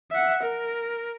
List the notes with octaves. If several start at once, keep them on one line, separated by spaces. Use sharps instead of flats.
E5 F#5
A#4